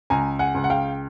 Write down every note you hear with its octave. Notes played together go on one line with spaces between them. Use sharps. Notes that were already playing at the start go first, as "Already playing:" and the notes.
C#2 G#5 A#5
F#5 G#5
C#2
F#5
F5 G5